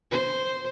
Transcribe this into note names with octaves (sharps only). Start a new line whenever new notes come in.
C5